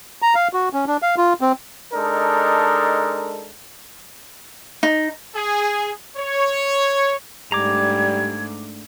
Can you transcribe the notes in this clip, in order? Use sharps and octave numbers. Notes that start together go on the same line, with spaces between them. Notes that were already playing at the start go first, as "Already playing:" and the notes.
A#5
F5
F#4
C#4
D4
F5
F4
C4
G#3 D4 D#4 A4 A#4
D#4
G#4
C#5
G#2 G3 A3 D4 A#5 D6 G#6